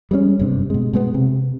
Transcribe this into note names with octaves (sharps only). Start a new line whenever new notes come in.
G3 G#3 C4 C#4
F#1 G2 C3
B2 G#3
B2 G#3 A3 B3
C3